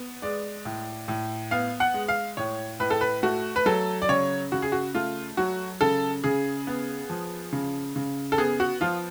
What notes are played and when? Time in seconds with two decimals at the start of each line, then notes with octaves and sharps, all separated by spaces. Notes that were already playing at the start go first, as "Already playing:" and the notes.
Already playing: B3
0.22 G#3 D5
0.65 A2
1.08 A2
1.51 B3 F5
1.80 F#5
1.94 G#3
2.08 F5
2.37 A2 C#5
2.80 A2 B4
2.90 A4
3.01 B4
3.23 A3 F#4
3.56 B4
3.66 F#3 A4
4.02 D5
4.09 C#3 C#5
4.52 C#3 F#4
4.62 G#4
4.72 F#4
4.95 A3 F4
5.37 F#3 F#4
5.81 C#3 A4
6.24 C#3 G#4
6.67 B3
7.10 F3
7.52 C#3
7.96 C#3
8.32 A4
8.38 B3 G#4
8.60 F#4
8.81 F3 F4